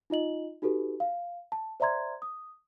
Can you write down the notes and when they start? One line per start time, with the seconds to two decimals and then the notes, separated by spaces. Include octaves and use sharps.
0.10 D#4 F4 D#5 F#7
0.62 D#4 F#4 G4 A4 B4
1.00 F5
1.52 A5
1.80 C5 D5 E5 A#5 C6 G#6
2.22 D#6